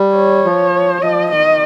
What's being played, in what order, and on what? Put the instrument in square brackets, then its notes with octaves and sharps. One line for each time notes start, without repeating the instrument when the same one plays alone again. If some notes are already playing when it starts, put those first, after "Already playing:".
Already playing: [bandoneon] G3
[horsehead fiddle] C#5
[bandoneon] F3
[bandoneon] F3 [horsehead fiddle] D#5
[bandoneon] D#3 [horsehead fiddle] D#5